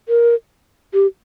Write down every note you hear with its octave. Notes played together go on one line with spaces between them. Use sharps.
A#4
G4